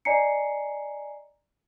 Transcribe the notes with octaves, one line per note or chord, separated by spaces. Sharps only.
D5 D#5 G#5 A#5 C7 C#7